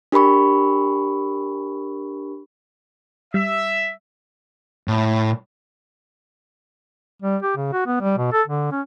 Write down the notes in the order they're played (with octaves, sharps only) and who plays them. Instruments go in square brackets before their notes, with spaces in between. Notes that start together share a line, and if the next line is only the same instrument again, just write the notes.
[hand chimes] D4 G4 A#4 B5 C#6
[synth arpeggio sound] G3 [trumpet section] E5
[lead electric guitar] A2
[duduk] G3
G4
C#3
F#4
B3
G3
B2
A4
D3
C#4